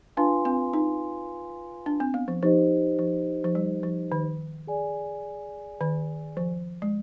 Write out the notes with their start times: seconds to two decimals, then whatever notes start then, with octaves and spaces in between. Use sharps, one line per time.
0.17 D4 F4 B4 F5 G#5 C6
0.45 C4
0.73 D#4
1.86 D4
2.00 C4
2.14 B3
2.28 F3
2.43 F3 D#4 G4 C5 D#5
2.99 F3
3.44 F3
3.55 G3
3.83 F3
4.12 D#3
4.67 G#4 D5 G#5
5.81 D#3
6.37 F3
6.82 G#3